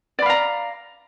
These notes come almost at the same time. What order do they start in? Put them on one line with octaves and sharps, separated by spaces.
D5 B5 F5 A#5